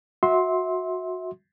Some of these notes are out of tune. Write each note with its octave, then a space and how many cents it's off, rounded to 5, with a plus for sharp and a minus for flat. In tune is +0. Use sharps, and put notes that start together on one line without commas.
F#4 -15 E5 -25 C6 +5